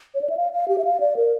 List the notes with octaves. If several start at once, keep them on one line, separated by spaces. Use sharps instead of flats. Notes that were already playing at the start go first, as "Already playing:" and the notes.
C#5
D5
E5
F5
F5
G4
E5
F5
D5
A#4